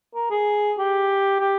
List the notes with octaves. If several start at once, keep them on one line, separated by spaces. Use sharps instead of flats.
A#4
G#4
G4
G4